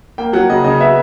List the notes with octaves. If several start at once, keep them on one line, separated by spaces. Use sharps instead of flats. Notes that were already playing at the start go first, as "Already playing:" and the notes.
A#3 G5
F#3 F#5
C#3 D#5
C#3 D#5
B3 E5